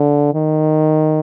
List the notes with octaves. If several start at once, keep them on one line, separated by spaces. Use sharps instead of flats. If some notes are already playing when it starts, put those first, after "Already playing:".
Already playing: D3
D#3